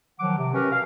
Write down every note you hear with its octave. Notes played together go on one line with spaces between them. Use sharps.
D#3 F3 F#3 F#5 D6
C3
C#4 G4 A#4 B4
B2 F5